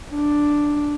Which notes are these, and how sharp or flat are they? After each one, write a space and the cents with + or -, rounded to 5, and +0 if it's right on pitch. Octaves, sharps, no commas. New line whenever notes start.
D4 +0